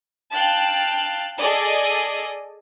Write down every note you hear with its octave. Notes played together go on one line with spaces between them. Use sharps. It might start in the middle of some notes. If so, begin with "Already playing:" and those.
F5 G5 A5 F#6
G#4 A4 D5 D#5 G#5